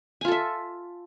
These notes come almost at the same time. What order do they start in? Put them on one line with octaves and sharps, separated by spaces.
G#5 F4 A4 E5